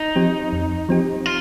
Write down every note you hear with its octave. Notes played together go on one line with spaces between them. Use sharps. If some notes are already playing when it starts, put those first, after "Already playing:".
Already playing: D#4
F3 C4 G4
F2
F3 C4 G4
F4